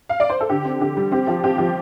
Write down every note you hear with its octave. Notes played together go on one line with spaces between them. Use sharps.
F5
D5
C5
A4
D3 G4
C4
D3 G4
G3
C4 G4
F3 G4
C4 G4
F3 G4